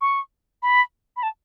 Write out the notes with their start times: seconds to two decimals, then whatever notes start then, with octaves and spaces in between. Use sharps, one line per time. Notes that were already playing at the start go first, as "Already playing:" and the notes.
0.01 C#6
0.63 B5
1.17 B5
1.23 A5